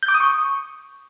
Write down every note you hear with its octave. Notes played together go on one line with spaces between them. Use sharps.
G6
D6
D#6
C#6